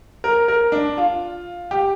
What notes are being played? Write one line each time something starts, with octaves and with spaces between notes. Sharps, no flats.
A#4
A#4
D4
F4
G4